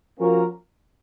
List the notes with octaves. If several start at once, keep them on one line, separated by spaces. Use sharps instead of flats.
F3 A#3 C#4 F#4 A#4